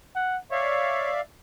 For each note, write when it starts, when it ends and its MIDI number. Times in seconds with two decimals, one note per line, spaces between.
0.15 0.37 78
0.52 1.11 73
0.52 1.21 74
0.52 1.21 76
0.52 1.21 77